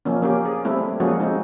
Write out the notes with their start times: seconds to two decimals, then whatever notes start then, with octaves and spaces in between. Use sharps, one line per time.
0.05 F3 A#3 C#4
0.22 A#3 C#4 G4
0.45 G#4
0.65 G3 A3 C4 E4
1.00 F3 G#3 A#3 C#4 F#4 G#4
1.20 G#3 C4 D#4